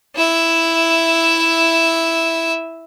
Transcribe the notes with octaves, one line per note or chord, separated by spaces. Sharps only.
E4 E5